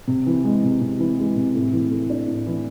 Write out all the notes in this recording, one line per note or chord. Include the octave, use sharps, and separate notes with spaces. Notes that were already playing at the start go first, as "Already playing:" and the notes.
C3
E3
G#3
C3
C3
E3
G#3
C3
A2
E3
A3
D4
A2
E3